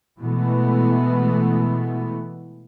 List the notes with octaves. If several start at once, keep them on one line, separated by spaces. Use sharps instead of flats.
B2 E3 G#3 A3 B3